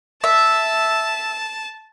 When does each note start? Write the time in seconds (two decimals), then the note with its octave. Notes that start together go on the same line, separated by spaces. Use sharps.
0.24 E5 A5